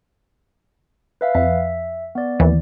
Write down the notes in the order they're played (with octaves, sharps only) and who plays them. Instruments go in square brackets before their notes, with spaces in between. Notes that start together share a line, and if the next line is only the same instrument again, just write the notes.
[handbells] B4 E5 F5
[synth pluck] F2 [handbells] E5
[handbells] B3 D5
[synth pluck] D#2 E3